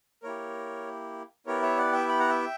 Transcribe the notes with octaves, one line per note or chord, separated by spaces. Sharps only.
A#3 E4 G4 A#4 C#5
B3 E4 G4 A#4 C#5
C#5 E5
D5 F#5
E5 G5
G5 B5
F#5 A#5
E5 G5